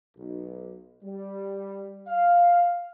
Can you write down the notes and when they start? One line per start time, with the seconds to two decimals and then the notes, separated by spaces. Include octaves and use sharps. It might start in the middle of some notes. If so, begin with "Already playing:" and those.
0.17 B1
1.04 G3
2.08 F5